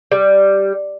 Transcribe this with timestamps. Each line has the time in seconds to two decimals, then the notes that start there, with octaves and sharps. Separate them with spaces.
0.12 G3